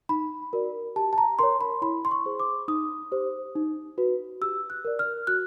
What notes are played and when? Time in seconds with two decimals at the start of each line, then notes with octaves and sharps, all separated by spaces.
0.09 D#4 B5
0.53 F#4 A#4 D5
0.96 G4 A5
1.13 A5
1.18 A#5
1.39 A#4 C#5 C6
1.61 B5
1.82 E4 B5
2.05 C6
2.11 C#6
2.26 G#4 C5
2.40 D6
2.68 D#4 D#6
3.12 G4 C5
3.56 D#4
3.98 F#4 B4
4.41 G4 E6
4.70 F#6
4.85 A#4 D5
4.99 F6
5.27 F#4 F#6